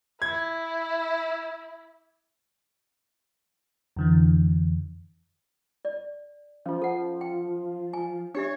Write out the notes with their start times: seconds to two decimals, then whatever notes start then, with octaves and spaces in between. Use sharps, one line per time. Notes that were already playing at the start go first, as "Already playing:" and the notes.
0.22 E4 G#6
3.96 F2 D3 E3
5.85 D5
6.66 F3 C#4 F4
6.82 A4 F#5
7.21 G5
7.93 G#5
8.35 D4 G4 C#5 E5